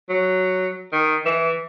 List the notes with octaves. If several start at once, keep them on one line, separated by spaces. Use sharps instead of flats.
F#3
D#3
E3